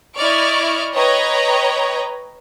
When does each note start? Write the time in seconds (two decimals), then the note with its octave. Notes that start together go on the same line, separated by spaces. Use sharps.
0.15 E4 D5 D#5 C#6 F6 D7
0.94 B4 C#5 D#5 G5 A#5